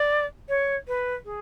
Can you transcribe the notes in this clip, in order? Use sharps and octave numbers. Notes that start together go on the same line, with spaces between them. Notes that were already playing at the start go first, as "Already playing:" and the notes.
Already playing: D5
C#5
B4
G#4